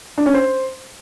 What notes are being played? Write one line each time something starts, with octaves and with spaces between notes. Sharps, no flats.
D4
C#4
C5